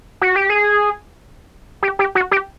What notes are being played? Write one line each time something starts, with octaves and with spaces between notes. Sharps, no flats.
F#4
G4
G#4
G4
G4
F#4
G4